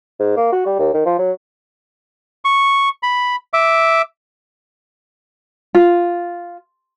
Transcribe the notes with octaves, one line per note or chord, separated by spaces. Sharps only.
G#2
A#3
F#4
G3
D#2
D#3
F3
F#3
C#6
B5
E5 D6
F4